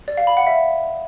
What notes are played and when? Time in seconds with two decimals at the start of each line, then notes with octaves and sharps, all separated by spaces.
0.08 D5
0.17 F5
0.27 B5
0.37 F#5
0.47 E5